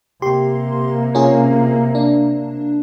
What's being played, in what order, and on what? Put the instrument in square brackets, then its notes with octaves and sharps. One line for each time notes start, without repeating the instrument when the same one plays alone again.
[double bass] C3 A#3 [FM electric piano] G4 C6
[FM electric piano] C#4 F4 G#4
D4